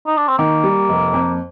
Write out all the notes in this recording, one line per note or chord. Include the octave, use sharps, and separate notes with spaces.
D#4
D4
C4
D#3 A#3
G3
F1
F2